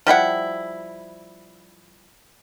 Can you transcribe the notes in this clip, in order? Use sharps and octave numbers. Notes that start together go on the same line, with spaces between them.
F3 G3 E4 F#5